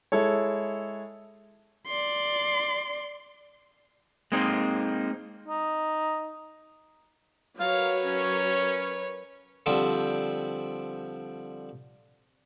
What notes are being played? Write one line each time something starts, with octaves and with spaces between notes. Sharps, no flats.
G#3 E4 A4 C#5
D5 C6
G#3 A#3 C4 D#4
D#4
F#3 A#4 B4 C#5 F5
C#4
D3 F3 G3 C4